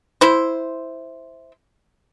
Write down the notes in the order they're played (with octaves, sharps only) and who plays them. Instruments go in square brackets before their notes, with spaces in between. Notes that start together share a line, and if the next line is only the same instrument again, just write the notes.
[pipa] E4 C5